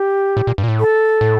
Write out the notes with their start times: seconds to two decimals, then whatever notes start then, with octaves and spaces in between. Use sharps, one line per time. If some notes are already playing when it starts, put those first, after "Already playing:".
Already playing: G4
0.37 A2
0.47 A#2
0.58 G2
0.63 A#2
0.68 A2
0.80 A4
1.21 A2